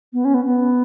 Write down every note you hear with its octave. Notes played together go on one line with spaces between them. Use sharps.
B3
C#4
B3
B3